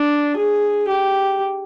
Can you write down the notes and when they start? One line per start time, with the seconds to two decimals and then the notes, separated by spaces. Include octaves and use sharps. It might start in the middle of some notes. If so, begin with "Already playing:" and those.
Already playing: D4
0.36 G#4
0.87 G4